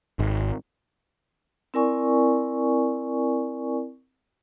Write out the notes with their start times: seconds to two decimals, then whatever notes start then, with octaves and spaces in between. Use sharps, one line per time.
0.19 G#1
1.74 C4 E4 A#4 D5 G#5 C#6